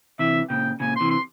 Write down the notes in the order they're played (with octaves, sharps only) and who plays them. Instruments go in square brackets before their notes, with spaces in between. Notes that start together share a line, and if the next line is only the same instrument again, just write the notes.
[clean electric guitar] C3 E3 [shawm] E5
[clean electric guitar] A#2 C#3 [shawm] G5
[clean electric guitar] A#2 C#3 [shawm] G#5
[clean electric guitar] C3 E3 [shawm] C6
[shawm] C6